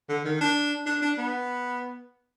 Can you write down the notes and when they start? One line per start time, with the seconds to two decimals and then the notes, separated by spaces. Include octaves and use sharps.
0.09 D3
0.25 D#3
0.41 D4
0.86 D4
1.02 D4
1.18 B3